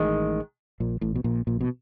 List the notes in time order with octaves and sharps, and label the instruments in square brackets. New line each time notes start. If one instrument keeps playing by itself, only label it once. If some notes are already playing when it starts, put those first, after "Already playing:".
Already playing: [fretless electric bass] A1 A2 [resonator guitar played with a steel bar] D#3 G#3
[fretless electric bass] A#1 A#2
A1 A2
B2
A#1 A#2
A#1 A#2
B2